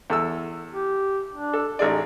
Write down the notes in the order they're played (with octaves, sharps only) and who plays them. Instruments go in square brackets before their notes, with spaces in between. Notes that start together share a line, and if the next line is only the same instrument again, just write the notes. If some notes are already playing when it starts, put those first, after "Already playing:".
[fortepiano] E2 A4 E6
[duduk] G4
D4
[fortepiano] A4
[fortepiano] A1 G#4 D5 [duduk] D#4